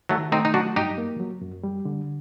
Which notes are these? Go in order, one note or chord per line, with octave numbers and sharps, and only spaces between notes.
D#3 F#3 A3
A3 C4 D#4
D#4
F#3 D4 F#4
G2 D#4 G4
A#3
F#3
F#2
G3
D3